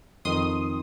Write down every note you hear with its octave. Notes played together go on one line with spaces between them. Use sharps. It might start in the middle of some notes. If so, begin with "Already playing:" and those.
F2 D#3 C6 D#6